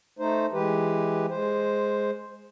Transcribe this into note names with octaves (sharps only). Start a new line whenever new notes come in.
A3 D#4 C5
E3 G#3 G4 B4
G#3 C5